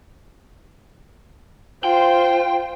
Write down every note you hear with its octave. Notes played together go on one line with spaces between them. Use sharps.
F4 C5 G5